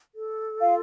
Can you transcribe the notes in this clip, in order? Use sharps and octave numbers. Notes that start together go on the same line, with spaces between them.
A4
F4 F5